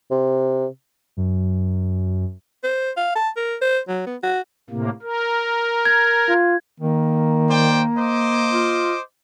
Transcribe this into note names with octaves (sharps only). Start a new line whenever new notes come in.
C3
F#2
C5
F5
A5
A#4
C5
F#3
B3
F#4
A2 C3 A#3
A#4
G#6
F4
D#3 A#3
C5 D5 G5
C5 D#5 D6
F4